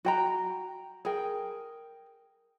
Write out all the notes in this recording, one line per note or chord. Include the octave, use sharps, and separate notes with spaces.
F#4 G5 A#5
G#4 A#4 G5